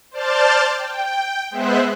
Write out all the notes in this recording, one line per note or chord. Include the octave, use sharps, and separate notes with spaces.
C5 D5 A5 F6 G6 A6
G5
G#3 B3 C5 E5 F#6